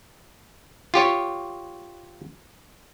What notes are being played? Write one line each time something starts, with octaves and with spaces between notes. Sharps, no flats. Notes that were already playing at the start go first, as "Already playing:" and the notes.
F4 G4 C#5